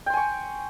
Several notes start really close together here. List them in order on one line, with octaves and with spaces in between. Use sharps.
G5 C6 G#5 C#6